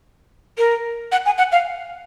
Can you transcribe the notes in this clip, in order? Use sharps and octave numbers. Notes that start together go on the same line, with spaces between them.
A#4
F#5
G#5
F#5
F5